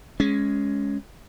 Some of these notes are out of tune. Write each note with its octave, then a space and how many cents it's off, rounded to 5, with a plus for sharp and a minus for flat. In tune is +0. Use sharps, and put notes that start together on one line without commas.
G#3 +0 C#4 +5